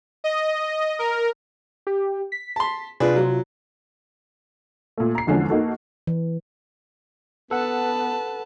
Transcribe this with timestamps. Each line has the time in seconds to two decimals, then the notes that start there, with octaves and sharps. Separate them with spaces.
0.24 D#5
0.99 A#4
1.87 G4
2.32 B6
2.56 A5 C6
3.00 C3 D4 F4 G#4 B4
3.16 F#3
4.98 A#2 A3
5.15 A#5 C7
5.27 E2 D3 F3 G#3 C#4
5.50 A#3 D#4 F#4 A4
6.07 E3
7.51 B3 A4 B4 F#5 A5